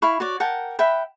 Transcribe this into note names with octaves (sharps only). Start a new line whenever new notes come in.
E4 F5 B5 C#6
F#4 C#5 D5
A#4 F#5 G5 A5
E5 F#5 G5 B5